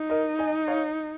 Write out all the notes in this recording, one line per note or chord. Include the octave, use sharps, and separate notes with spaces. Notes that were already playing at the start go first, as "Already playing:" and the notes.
Already playing: D#4
A#4 D#5
D#5 G#5
C#5 F5